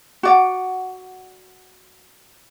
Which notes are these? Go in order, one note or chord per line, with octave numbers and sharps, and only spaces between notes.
F#4 D5 F#5